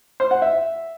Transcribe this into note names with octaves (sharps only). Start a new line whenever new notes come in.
C5
F#5
E5